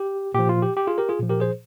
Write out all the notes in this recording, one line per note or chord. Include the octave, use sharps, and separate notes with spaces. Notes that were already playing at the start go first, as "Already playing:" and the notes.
Already playing: G4
A#2 F3 G4
F4
G4
G4
F4 G#4
G4 A#4
F4 G#4
A#2 F3
G4 A#4
G#4 C5